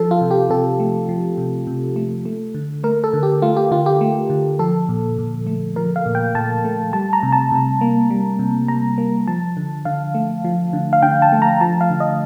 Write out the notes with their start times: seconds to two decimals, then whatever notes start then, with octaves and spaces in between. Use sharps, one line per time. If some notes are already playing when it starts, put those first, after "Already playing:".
Already playing: F3 A4
0.11 F4
0.21 C3
0.31 G4
0.50 C3 A4
0.80 A3
1.09 F3
1.38 C3
1.67 C3
1.96 A3
2.25 A3
2.54 D3
2.84 A3 A#4
3.04 A4
3.13 D3
3.23 G4
3.42 A3 F4
3.57 G4
3.71 D3 F4
3.86 G4
4.01 A3
4.30 D3
4.59 F3 A4
4.89 A#2
5.18 A#2
5.47 A3
5.76 F3 A#4
5.96 F5
6.06 A#2
6.15 G5
6.35 A#2 A5
6.65 A3
6.93 G3 A5
7.13 A#5
7.23 C3
7.32 A5
7.52 C3
7.81 A#3
8.10 G3
8.39 C3
8.68 C3 A#5
8.98 A#3
9.27 F3 A5
9.57 D3
9.85 D3 F5
10.15 A3
10.44 F3
10.73 D3
10.93 F5
11.02 D3 G5
11.22 A5
11.32 A3
11.42 A#5
11.61 F3 A5
11.81 F5
11.90 D3
12.00 D#5